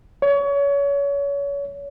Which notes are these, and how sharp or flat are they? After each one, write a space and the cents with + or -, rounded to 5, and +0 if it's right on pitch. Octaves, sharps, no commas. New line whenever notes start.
C#5 +30